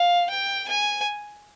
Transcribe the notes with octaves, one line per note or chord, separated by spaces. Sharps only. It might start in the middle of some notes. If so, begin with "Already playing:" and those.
Already playing: F5
G5
G#5